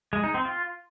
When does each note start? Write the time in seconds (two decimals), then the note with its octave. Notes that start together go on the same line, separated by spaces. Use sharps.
0.13 G#3
0.24 D#4
0.34 C4
0.45 F4